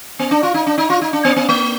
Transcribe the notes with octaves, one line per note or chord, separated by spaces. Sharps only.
B3
D4
F4
D#4
D4
D#4
F4
D#4
D4
B3
B3
A#3